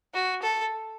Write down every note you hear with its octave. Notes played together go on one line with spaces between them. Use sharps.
F#4
A4